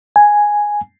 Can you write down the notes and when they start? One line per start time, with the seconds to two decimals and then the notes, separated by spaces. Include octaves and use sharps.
0.16 G#5